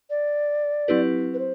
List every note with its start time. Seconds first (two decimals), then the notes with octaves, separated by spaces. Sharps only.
0.10 D5
0.88 F#3 C4 E4 G4 B4
1.34 B4
1.39 C5